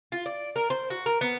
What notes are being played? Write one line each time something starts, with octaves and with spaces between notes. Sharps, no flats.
F4
D5
A#4
C5
F#4
A#4
B3